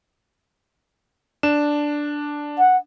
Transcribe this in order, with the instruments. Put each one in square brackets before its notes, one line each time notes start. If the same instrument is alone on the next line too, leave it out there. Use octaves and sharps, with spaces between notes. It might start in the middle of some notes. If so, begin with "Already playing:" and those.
[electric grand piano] D4 E7
[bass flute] F#5